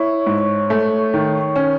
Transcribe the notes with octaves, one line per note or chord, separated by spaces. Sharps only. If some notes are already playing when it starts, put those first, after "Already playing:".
Already playing: E4 C#5
G#2
A3
D#3
C#4